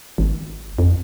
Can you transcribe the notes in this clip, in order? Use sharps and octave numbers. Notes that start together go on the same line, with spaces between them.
G#1
F2